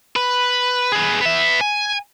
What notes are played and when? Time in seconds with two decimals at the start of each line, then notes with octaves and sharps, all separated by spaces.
0.16 B4
0.92 G#4 B4
1.21 B3 E5
1.61 G#5